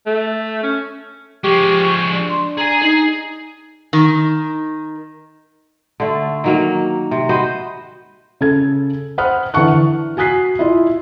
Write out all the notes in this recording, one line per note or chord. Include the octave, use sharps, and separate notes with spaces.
A3
C#4
F3 G#3 G4 C#6
D4
C6
G#4 G#5 A#5
D#4 G#4
D#3
D3 A3
D#3 F#3 A#3
C3
F#4 B4 C5 D#5
C#3 A4 G#6
C5 F#5 B5 D#6 F6 F#6
D3 E3 F#5 A5 C#6 F#6
E3
F#4 G#5 D#6 F#6 B6 C7
E4 F4 D#5